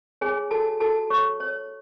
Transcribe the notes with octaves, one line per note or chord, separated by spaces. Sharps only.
G#4 C#5 G#5
F#4 A4 A5
F#4 A4 A5
C#5 C#6
C#5